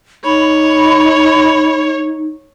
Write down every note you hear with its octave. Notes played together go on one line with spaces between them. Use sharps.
D#4 C#5 B5